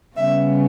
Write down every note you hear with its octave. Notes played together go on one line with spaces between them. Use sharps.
C#3 G3 B3 E5